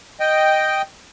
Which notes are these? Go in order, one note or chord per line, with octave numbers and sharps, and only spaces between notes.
D#5 G5